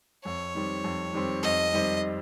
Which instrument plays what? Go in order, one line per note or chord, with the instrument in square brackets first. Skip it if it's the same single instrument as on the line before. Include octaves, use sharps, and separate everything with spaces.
[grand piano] F2 [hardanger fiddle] C#5
[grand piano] D#3 G3 C4
F2
D#3 G3 C4
[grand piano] F2 [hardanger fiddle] D#5
[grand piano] D#3 G3 C4